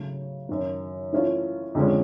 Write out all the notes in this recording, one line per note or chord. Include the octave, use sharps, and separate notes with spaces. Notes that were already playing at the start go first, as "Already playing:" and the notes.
Already playing: C#3 F#3 A3
F#2 D#3 F#3
E3 A3 C#4 F4
F2 D3 F3 G#3 C#4